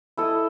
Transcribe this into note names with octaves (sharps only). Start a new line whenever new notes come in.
E4 A4 D#5